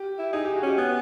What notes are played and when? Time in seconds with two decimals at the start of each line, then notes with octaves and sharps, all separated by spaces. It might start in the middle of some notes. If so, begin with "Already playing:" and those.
Already playing: G4
0.19 E4
0.33 D#4 G#4
0.45 G4
0.56 F#4
0.63 C#4 G4
0.78 B3 G#4